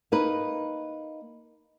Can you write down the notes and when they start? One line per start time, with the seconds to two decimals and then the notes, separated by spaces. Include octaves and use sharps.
0.12 A#3 D#4 B4